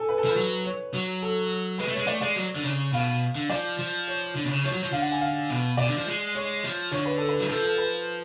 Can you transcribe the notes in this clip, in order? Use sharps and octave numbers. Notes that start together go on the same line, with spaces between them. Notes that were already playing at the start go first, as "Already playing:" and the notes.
Already playing: A4 G#5
B4
A4
F3 B4
F#3
C#5
F#3
A4
G#3 B4
A3
G#3 C#5
A3 D5
G#3 D5
F#3
D3
C#3
B2 F5
D3
F3 D5
F3
C#5
D3
B2
C#3
F3 C#5
F#3
F3
D3 F5
F#5
G#5
F5
B2
B2 D5
D3
F3
G#3
C#5
F3
D3 C#5
B4
A4
B4
F#3
F3 A4
A4
B4